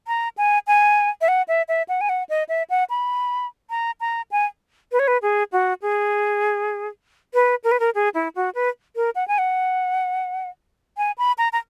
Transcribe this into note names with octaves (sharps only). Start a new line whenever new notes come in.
A#5
G#5
G#5
E5
F#5
E5
E5
F#5
G#5
F#5
D#5
E5
F#5
B5
A#5
A#5
G#5
B4
C#5
B4
G#4
F#4
G#4
B4
A#4
B4
A#4
G#4
E4
F#4
B4
A#4
F#5
G#5
F#5
G#5
B5
A#5
A#5